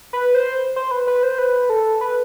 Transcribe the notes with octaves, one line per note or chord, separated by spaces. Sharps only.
B4
C5
C5
B4
B4
C5
B4
A4
B4